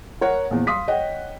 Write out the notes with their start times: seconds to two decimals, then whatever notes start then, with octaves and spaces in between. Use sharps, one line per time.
0.21 A#4 C#5 F#5
0.51 A#1 E2
0.67 F5 C6 D#6 B6
0.88 C#5 D#5 F#5 G5